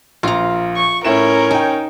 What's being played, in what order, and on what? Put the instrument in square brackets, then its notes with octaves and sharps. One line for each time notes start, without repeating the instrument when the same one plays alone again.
[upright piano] A#1 [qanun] F4 A#5
[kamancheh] C#6
[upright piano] A2 E4 E7 [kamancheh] C#4 A#4
[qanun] D#4 [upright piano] G5 G#5